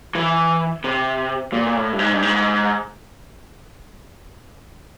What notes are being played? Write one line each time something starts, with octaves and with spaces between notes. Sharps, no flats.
E3
C3
A#2
A#2
A2
G2
G#2
G2
G#2